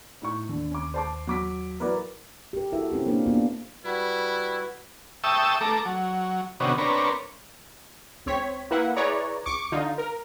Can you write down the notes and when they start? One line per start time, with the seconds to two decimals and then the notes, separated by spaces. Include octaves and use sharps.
0.22 A2 D#4 C#6
0.49 D#2 D3
0.71 C#4 D6
0.94 C5 A5 D6
1.27 F#3 D6 B6
1.80 F#3 E4 A#4 B4 D5
2.53 G4 A#4
2.72 E4 F#4 A4 A#4 E5
2.91 C4 C#4 E4 G4
3.06 A#3 C4 D4 A#4
3.26 A#3 B3 D4 F4
3.85 G3 E4 F#4 B4
5.24 E5 G5 A5 C#6 D#6 E6
5.61 A3 A4 A#5 D6
5.85 F#3
6.60 C3 D#3 B3 C#4 D4 F#4
6.78 C4 D4 A#4 B4 C#5
8.26 C#2 C4 C#5 B6
8.70 A#3 E4 B4 E5 F#5
8.96 E4 G#4 B4 C#5 D5 A#5
9.46 C#2 C#6 D6 C#7
9.72 D3 D#4 F4
9.98 A#4